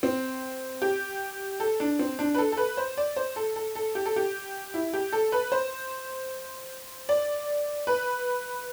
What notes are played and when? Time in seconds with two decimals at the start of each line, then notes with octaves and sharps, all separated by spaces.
0.03 C4
0.82 G4
1.60 A4
1.80 D4
1.99 C4
2.19 D4
2.35 B4
2.38 A4
2.52 A4
2.57 B4
2.77 C5
2.97 D5
3.16 C5
3.36 A4
3.56 A4
3.75 A4
3.95 G4
4.06 A4
4.16 G4
4.74 E4
4.93 G4
5.13 A4
5.32 B4
5.52 C5
7.09 D5
7.87 B4